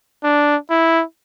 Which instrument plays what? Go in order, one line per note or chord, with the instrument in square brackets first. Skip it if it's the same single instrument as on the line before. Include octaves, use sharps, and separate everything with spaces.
[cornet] D4
E4